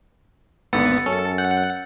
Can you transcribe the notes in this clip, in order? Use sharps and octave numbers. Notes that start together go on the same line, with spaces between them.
G#1 D#2 D3 B3 E6 A6 C#7
F#2 C#4 A4
F#5 G6